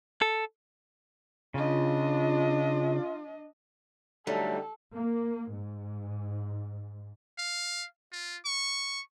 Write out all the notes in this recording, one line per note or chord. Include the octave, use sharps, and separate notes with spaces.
A4
C#3 D4 F4 D#5
D3 F#3 G3 A3 D#4 A4
A#3
G#2
F5
F4
C#6